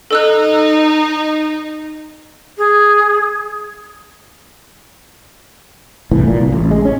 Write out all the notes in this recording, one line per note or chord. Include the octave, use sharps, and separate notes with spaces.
D#4 A4 E6 F#6
G#4
F1 C2 A2 E3
A#2
C2
A1
G#3
C#4